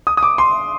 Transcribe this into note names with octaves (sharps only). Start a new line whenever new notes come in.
D#6
D#6
D6
C6